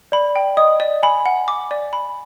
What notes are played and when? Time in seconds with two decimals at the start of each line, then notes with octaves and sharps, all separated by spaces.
0.12 D5 B5
0.36 G5
0.57 D#5 D#6
0.80 D5
1.03 G#5 B5
1.26 F#5
1.48 D6
1.71 D5
1.93 B5